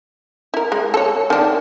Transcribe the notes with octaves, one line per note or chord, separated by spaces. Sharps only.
E4 A#4
G#3
A4 C#5
D#3 D4